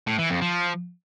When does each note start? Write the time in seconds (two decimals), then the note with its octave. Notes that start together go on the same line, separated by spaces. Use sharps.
0.07 A2
0.18 E3
0.30 F2
0.41 F3